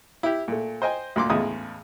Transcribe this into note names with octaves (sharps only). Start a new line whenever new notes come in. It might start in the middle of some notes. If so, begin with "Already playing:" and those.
E4 G4
A#2 A3
C5 D#5 G5 G#5
D2 A#2 C6 D6
E2 A2 C#3 G#3 D#6